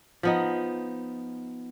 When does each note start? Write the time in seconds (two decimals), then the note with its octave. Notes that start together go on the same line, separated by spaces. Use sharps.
0.23 F3 B3 D#4